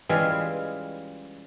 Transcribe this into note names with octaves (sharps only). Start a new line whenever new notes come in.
E3 G3 G#3 C#4 F4